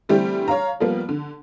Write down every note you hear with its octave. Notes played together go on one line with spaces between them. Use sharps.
D3 E3 G3 A3 C4 G4
C#5 F5 A#5
F3 G3 A#3 B3
D3